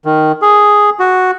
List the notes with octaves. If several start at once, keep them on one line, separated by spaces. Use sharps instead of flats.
D#3
G#4
F#4